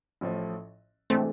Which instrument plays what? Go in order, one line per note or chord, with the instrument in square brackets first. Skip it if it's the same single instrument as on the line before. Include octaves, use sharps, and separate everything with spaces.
[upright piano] A1 A2 F3
[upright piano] C3 E3 G#3 D4 [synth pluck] A3 C4